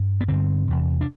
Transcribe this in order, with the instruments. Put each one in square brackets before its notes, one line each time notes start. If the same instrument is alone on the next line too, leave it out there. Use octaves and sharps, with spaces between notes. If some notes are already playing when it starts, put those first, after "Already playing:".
Already playing: [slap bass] G2
B3
G2 D3 C4
E2 C3
D4